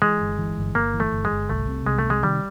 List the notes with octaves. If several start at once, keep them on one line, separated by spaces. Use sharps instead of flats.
E3 G#3
G1
E3
G1
G1 A#3
E3
A3
G1
G#3
G1
C2 A3
C3
C2 G#3
A3
C3
G#3
D#3 G3